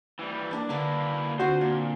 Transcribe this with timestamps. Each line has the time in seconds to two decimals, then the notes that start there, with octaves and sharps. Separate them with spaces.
0.19 E3 G3
0.51 A#3 D4 D5
0.69 D3 A#3 E4 B4 F5
1.40 D3 C4 F4 F#4 C5
1.61 A#2 A#4